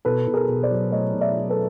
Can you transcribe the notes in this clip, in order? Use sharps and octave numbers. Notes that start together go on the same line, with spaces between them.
B2 A4 B4
B2
G#4 A#4
B2
C5 D5
F#3
A3 C#5 D#5
B2
D5 E5
F#3
A4 B4